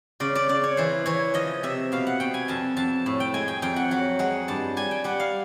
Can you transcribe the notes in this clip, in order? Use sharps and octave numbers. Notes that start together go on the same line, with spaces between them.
C#3 D5
D5
C#3 D5
C#5
E3 C5
E3 C#5
F3 D#5
C3 E5
B2 F5
F#5
B2 G5
G#5
F2 A5
F2 A5
A2
G5
G#3 G#5
G5
F2 G5
F#5
F#3 F#5
G#3 F#5
G2 A5
G3 G#5
G5
G3 F#5
F5